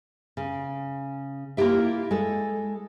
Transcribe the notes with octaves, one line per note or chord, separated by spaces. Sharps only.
C#3
A#3 E4 F4 G4 E5
G#3 A4